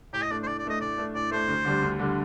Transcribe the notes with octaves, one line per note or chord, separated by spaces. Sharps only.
A2 G4
D#5
A3 D4 D5
C5
A2 D5
D5
A3 D4 D#5
A2 D5
A3 D4
A2 D5
A3 D4 C5
D2
D3 G3 D4
D2
D3 G3 D4